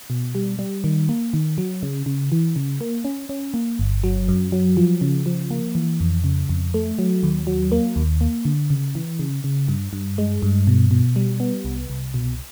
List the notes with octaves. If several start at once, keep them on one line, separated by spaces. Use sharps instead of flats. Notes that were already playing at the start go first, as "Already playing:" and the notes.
B2
G3
G3
D#3
A#3
D#3
F#3
C#3
C#3
E3
C#3
A#3
C#4
C#4
A#3
G1
F#3
F#2
F#3
F3
C#3
F3
A#3
E3
F2
C#3
F2
A3
F#3
D#2
F#3
A#3
D#2
A#3
D3
C#3
E3
C#3
C#3
G2
G2
G#3
G2
B2
B2
G3
B3
C2
C2
B2